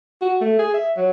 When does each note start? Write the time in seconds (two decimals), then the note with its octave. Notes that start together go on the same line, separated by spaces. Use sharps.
0.22 F#4
0.41 A3
0.59 G#4
0.74 E5
0.97 F#3